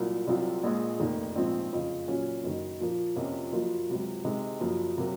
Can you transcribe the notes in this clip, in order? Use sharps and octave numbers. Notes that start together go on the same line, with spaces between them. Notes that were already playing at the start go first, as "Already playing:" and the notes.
Already playing: C2 A#2 F#3 A#3 F4
C2 C3 F#3 C4 F4
A#1 A#2 G#3
F1 D#2 D#3
A#1 G#2 F3 C4
F#1 F2 C#3
A#2 F#3 C#4
F#1 F#2 D#3
A#2 F3 A#3
F2 C3 F3 A#3 C#4
F#1 F#2 F3 A#3 F4
C#2 C3 F#3
C3 D#3 G#3
F#1 F#2 F3
C3 F#3 A#3